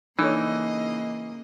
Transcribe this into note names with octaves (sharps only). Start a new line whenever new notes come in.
C#3 E3 A#3 D4 D#4 A4 C#5 D#5